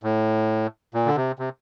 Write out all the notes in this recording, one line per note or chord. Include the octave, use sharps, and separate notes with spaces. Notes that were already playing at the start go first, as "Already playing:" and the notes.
A2
A#2
D3
C3
C3